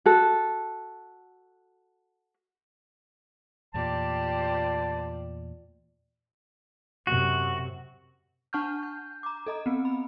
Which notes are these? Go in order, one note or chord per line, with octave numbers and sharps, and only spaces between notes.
F#4 A4
E2 A#2 A3 F4 G4 C5 D5 A5
F#2 C3 F#4
D4 F#5 A5 C#6 F6 G6
G6
A#5 D6
A4 D#5 A#5
B3 C4
B5